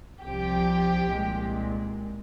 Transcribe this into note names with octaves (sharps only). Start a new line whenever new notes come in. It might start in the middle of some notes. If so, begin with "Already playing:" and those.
C2 C3 F3 G4
C2 A#2 G#3